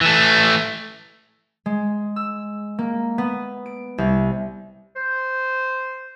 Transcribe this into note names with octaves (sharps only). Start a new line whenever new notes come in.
E3 A3
G#3
E6
A#3
B3
D7
C2
C5